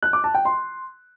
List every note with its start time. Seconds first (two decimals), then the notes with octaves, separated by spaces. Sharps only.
0.02 F#6
0.13 D6
0.24 A5
0.34 G5
0.45 C6